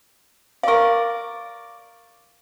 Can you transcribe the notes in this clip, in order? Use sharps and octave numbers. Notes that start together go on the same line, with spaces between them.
A#4 D5 F5 C#6